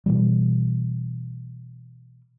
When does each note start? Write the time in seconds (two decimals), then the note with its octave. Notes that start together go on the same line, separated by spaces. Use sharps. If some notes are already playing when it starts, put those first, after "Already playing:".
0.06 B2 E3 G3